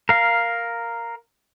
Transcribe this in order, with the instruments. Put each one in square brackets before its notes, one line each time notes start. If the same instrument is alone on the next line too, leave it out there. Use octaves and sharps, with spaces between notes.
[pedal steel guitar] A#4 F5